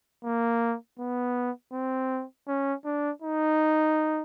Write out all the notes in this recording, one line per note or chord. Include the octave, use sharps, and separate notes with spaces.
A#3
B3
C4
C#4
D4
D#4